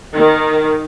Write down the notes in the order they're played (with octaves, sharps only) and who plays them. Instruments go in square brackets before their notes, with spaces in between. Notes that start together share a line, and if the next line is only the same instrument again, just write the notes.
[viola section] D#3